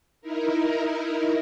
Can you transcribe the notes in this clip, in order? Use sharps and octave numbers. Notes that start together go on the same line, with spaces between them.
D#4 E4 A#4